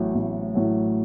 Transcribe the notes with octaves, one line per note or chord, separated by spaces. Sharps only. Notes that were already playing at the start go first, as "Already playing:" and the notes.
Already playing: A1 A2 F#3
A1
A2 F#3